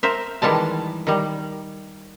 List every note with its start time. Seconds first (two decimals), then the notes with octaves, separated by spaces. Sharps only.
0.03 A#4 C5 E5
0.42 D#3 E3 G3 G#3 A5
1.07 D#3 G3